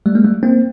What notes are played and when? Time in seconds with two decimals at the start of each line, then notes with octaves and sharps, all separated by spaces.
0.06 G3 A3
0.15 G#3 A#3
0.24 G3 A3
0.43 A#3 C4